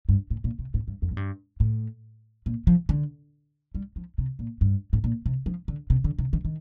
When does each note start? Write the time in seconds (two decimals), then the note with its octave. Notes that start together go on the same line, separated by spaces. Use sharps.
0.09 G2
0.30 A2
0.44 A#2
0.59 C3
0.74 A2
0.88 G2
1.02 F2
1.11 A2
1.17 G2
1.60 A2
2.46 A#2
2.67 F3
2.89 D3
3.75 G3
3.96 F3
4.18 C3
4.39 A#2
4.61 G2
4.93 A2
5.04 A#2
5.26 C3
5.46 F3
5.68 D3
5.90 C3
6.04 D3
6.19 C3
6.33 D#3
6.45 D#3